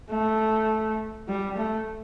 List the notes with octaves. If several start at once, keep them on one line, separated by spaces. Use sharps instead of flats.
A3
G3
A3